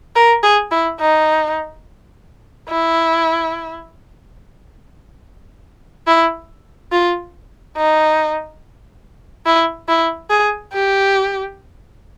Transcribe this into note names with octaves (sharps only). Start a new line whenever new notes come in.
A#4
G#4
E4
D#4
E4
E4
F4
D#4
E4
E4
G#4
G4